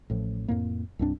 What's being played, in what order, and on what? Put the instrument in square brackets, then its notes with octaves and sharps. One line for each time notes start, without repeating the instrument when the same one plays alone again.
[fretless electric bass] A1 A2 F3
F2 A2 A#3
C2 G2 C4 D4